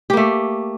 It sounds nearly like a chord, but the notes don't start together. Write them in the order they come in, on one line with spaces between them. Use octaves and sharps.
G4 A#3 A3